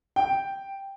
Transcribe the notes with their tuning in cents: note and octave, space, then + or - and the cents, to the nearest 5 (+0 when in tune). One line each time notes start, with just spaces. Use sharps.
G5 +0